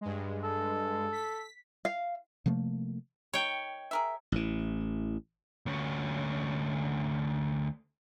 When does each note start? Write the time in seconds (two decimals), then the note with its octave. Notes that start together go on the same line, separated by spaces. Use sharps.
0.01 G2 G#3
0.44 A4
1.12 B6
1.85 F5
2.46 C3 F3 A3 A#3
3.33 D#3 C#5 G5
3.91 G#4 A#4 E5
4.32 A1 E3
5.66 D2 C#4